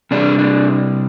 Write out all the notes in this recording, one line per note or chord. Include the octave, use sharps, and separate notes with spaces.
C3 G3 D4
D4